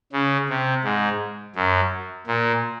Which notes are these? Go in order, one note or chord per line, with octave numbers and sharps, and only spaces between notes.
C#3
C3
G#2
F#2
A#2